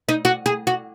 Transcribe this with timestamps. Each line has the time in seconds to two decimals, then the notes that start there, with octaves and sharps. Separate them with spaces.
0.09 D#4
0.25 F#4
0.46 G#4
0.67 F#4